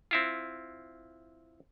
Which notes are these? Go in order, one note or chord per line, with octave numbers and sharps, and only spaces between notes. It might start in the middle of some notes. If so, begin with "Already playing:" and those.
C4 E4 F4